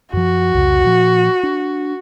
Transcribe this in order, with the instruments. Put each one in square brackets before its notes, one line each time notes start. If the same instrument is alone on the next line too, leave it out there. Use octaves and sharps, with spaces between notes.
[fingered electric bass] F#2 F3 [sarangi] F#4
[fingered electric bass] C2 F2 C#3
A#2 F3
D4